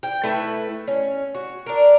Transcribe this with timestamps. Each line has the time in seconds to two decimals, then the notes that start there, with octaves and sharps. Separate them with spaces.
0.03 G5
0.24 A3 E4 B4
0.88 C#4
1.35 F#4
1.66 D4 A#4